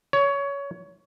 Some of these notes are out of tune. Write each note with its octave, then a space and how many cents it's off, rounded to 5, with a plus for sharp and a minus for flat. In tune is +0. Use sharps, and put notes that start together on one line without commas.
C#5 +20